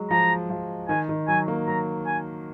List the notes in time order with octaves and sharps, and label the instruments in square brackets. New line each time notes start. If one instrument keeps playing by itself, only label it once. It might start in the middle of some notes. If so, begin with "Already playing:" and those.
Already playing: [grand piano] F#3 G#3
[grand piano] F3 [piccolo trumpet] A#5
[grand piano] F3
[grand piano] D#3 [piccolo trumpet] G#5
[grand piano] D#3
[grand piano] F#3 [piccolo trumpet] G#5
[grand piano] A#3
[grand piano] F#3 [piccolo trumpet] A#5
[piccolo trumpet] G#5